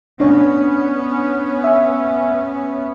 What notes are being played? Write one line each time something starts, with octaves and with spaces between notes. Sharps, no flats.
B3 C#4 D4 C#5
E5 G#5